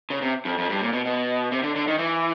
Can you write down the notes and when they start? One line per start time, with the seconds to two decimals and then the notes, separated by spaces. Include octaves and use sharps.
0.10 C#3
0.22 C3
0.45 F2
0.58 F2
0.70 G2
0.81 A#2
0.93 B2
1.05 B2
1.52 C3
1.63 D3
1.76 D3
1.87 D#3
1.98 E3